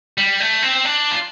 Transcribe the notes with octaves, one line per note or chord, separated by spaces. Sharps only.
G3
A3
C4
D4
F4